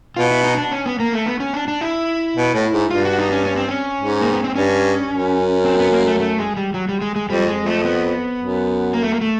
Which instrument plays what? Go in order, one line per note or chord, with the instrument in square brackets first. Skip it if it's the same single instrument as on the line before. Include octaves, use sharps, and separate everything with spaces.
[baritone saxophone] B2 [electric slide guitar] F4
[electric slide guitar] E4
D#4
D4
C#4
B3
A#3
A3
B3
C#4
D4
D4
E4
[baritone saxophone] B2
A2
G#2
[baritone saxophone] G2 [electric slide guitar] F4
[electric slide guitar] F#4
D#4
C#4
C#4
C4
C#4
[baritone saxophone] G#2
[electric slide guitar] A#3
B3
C4
[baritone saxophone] G2 [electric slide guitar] C#4
[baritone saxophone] F#2
[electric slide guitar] C4
B3
A#3
A3
A3
G#3
G3
F#3
G3
G#3
G#3
[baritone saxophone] F2 [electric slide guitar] G3
[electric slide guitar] G#3
[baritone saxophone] F2
[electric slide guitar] A3
B3
[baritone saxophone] F#2
[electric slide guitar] A#3
A3
A#3
A3